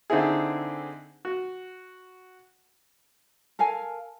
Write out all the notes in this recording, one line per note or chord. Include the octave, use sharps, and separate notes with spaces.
D3 C4 D#4 E4 G#4
F#4
A4 A#4 F5 G#5